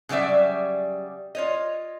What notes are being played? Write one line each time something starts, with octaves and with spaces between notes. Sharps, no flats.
C#3 F#3 G3 D5 E5
F4 C#5 D#5